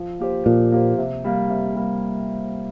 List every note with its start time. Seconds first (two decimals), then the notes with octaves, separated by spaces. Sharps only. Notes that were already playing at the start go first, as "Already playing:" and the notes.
Already playing: F3
0.19 A#3 G4 C5
0.46 A#2 F3
0.72 A#3 G4 C5
0.98 C3
1.24 G3 A#3
1.50 C3
1.76 G3 A#3